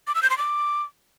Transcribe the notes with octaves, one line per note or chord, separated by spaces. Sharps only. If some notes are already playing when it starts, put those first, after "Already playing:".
D6
E6
G6
C6
D6